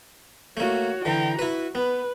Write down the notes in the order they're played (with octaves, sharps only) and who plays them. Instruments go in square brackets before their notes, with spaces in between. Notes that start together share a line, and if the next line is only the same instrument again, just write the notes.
[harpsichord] A3 A#3 [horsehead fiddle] F#4 C#5
[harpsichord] D3 E3 [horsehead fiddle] G5 A#5
[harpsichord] E4 B4 [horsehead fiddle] F#4
[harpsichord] B3 [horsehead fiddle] B4